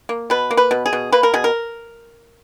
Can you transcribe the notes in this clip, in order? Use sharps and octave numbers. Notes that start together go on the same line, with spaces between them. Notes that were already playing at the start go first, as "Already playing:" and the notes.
A#3
B2 B4
A#3
B4
B2
G#4
B2
A#3 B4
A#4
B2 G#4
A#4